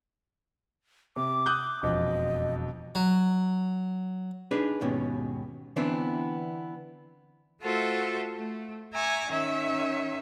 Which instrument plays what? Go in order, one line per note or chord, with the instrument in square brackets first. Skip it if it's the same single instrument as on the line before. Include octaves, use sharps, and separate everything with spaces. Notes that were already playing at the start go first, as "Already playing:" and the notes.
[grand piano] C3 [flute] D6
[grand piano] D#6 F#6 G6
[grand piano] E1 F2 [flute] D#5
[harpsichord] F#3
[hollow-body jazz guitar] D4 D#4 G#4 B4
D#2 G#2 B2 C#4
D3 E3 B3 C4 D4 E4
[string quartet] A3 F4 F#4 A4 C5 E5
A3
E5 G#5 A#5 C#6 D6
D#3 C#4 E5